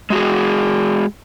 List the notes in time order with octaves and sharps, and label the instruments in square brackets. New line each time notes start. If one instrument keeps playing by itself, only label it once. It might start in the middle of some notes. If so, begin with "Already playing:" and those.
[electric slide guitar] G#3 F#4 G#4